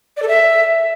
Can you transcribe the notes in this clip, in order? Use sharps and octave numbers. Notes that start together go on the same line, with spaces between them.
D5
A4
E5